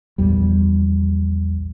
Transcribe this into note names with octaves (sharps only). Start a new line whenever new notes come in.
A#1 E2 G3